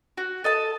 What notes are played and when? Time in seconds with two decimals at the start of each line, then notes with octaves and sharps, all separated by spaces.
0.17 F#4
0.44 A4 D#5 A5